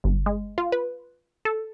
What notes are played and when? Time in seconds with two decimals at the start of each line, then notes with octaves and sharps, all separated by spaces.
0.04 G1
0.26 G#3
0.58 F4
0.72 B4
1.45 A4